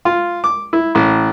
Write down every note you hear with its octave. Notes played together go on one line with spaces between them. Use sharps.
F4
D6
E4
A1